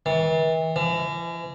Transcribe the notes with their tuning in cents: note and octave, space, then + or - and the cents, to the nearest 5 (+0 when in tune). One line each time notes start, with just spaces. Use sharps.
E3 -40
E3 +40